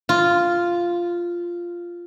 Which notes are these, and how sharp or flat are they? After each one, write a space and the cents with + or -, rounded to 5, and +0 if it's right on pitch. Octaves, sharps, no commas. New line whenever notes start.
F4 -5